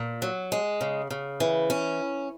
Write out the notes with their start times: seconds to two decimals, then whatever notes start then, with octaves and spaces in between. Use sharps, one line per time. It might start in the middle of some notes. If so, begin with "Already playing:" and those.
Already playing: A#2
0.22 F#3
0.52 G#3
0.81 C#3
1.10 C#3
1.40 E3
1.70 C#4